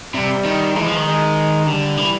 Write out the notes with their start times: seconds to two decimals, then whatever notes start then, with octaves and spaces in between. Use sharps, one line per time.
0.14 C3 G3
0.45 D#3
0.76 E3 G#3
0.86 F3
0.96 D#3
1.06 G#3
1.67 D3 G3
1.97 E3